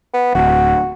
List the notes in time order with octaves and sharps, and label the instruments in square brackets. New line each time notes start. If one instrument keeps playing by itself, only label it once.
[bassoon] B3
[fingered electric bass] D1 [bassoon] F#4